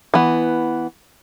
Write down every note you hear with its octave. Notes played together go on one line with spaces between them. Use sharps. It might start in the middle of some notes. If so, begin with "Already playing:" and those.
E3 B3